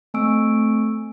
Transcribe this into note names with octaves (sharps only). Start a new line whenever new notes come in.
A3 C4 G#5 C#6 E6 D7